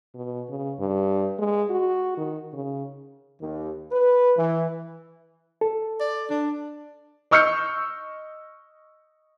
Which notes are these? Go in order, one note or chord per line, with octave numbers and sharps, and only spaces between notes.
B2
C#3
G2
G#3
F#4
D#3
C#3
D#2
B4
E3
A4
D5
D4
D#5 C#6 E6 F6 G6 C#7